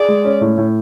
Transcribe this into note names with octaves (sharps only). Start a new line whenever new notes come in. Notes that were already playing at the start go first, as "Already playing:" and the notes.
Already playing: G#4 D5
G#3
C#4
A2
A2